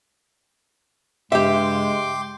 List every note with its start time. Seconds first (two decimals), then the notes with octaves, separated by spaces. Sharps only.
1.32 G2 C#3 G#3 G4 E5 G5 C6 D6